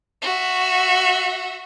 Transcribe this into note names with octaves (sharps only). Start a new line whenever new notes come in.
F#4 E5